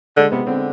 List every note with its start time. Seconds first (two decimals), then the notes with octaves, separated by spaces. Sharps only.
0.17 D3 G#3
0.32 C3 B3
0.47 D3 C4